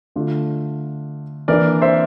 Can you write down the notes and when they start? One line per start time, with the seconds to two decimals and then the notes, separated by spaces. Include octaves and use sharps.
0.16 D3 A3 D4 F4
1.48 E3 A#3 D4 A#4 D5
1.82 C5 E5